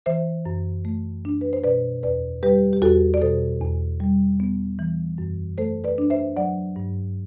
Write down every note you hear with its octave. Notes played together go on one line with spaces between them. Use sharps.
E3 C5 E5
F#2
A3
D4
B4
C5
B2 B4 D5
E2 B4 D5
G3 G4 B4
G4
E2 F#4 A4
D5
B2 A4 C5
E2
G3
B3
E3
F#2
A3 A4 C5
B4 D5
D4
C5 E5
F#3 D5 F#5
G2